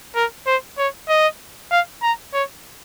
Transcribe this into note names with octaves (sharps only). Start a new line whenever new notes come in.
A#4
C5
C#5
D#5
F5
A#5
C#5